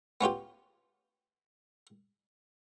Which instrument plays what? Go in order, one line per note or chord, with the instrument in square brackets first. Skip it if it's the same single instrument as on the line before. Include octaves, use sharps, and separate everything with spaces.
[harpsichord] B3 C#4 F4 G4